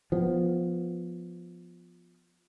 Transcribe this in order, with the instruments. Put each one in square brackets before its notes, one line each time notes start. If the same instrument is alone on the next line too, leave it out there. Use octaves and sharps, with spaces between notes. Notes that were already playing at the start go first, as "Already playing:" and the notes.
[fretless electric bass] F3 B3